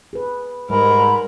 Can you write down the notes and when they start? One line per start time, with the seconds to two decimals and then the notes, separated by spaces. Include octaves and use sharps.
0.13 G#4 B4
0.70 G#2 G3 A#4 B5